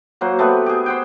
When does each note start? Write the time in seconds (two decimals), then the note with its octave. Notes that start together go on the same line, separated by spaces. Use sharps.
0.21 F#3 A#3 C5 F#5
0.39 A3 B3 G4 B4
0.66 G4 G#4
0.86 C5 F#5 G5